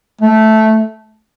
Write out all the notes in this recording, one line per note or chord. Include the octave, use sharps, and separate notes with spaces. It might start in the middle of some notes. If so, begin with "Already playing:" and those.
A3